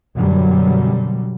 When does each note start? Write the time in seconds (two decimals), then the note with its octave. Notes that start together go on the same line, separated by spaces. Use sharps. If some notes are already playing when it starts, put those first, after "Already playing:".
0.16 F#2 B2 D3 F#3 G3